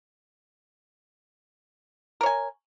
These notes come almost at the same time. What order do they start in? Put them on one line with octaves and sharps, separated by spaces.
A#4 C#5 G#5